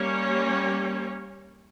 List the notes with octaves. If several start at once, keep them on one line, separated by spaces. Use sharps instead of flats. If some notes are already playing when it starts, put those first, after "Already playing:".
Already playing: G3 A#3 C#4 C#5